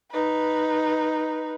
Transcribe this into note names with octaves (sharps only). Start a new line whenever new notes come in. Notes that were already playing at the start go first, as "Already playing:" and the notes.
D#4 B4